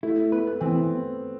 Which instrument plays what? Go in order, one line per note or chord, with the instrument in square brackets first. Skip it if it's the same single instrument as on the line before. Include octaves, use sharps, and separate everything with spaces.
[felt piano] A3 [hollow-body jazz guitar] E4
[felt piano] B3 [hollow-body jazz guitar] B4
[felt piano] A3
B3
[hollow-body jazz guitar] E3 [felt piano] C4
[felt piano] B3